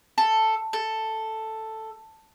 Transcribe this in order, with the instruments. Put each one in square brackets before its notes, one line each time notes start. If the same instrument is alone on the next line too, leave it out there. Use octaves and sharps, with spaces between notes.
[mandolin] A4
A4